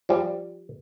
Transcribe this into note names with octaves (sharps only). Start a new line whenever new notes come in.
F3 G3